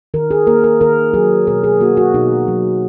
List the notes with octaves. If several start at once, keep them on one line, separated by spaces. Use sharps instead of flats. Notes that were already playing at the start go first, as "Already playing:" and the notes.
D#3 A#4
G#4
A#3 A#4
A#4
D#3 A#4
F#3 G#4
B2 A#4
G#4
A#3 F#4
F#4
B2 D#4
F#3